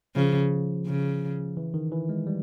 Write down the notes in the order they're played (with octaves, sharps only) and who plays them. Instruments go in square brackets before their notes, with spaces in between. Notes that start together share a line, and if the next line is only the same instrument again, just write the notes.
[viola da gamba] C#3 [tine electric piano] F3
[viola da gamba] C#3
[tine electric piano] E3
D#3
E3
G#3
G3